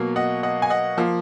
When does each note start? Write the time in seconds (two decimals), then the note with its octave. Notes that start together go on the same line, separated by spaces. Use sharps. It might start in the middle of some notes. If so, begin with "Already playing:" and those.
Already playing: B2 F#3 A#3
0.16 D#5 F#5
0.43 D#5 F#5
0.62 G#5
0.70 D#5 F#5
0.97 F3 A#3